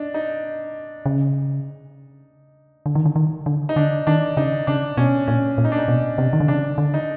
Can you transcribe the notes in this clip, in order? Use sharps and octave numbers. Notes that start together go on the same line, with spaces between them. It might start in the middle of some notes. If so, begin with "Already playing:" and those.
Already playing: D4 D#4
D#4
C#3
D3
D#3
D3
D#3
D3
D#4
D3 D4
D#3 D4
C#3 D#4
C#3 D4
B2 C#4
A#2 C#4
A#2
D#4
D4
D#4
B2
C3
D#3
D3
C#3 D4
D3
D#4